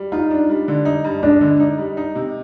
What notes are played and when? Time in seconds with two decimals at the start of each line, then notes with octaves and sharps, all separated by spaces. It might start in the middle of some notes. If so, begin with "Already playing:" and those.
Already playing: G3
0.12 D#4 F4
0.31 D4
0.50 G3
0.68 D3
0.85 D#4
1.04 G2
1.23 G#3 D4
1.41 D3
1.60 D#4
1.78 G3
1.97 D#4
2.15 C3